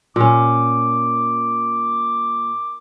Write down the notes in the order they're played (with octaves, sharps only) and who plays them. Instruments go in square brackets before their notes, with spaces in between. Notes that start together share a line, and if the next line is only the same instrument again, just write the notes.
[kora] A#2 C#4 [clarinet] D6